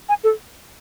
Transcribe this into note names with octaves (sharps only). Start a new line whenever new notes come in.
G#5
A4